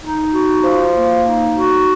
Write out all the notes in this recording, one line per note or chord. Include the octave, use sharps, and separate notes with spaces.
D#4
F#4
F3
A#3
D#4
F#4